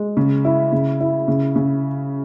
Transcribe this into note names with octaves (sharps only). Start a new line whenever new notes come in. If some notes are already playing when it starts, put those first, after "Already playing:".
Already playing: G#3
C#3
E4
C#3
E4
C#3
C#3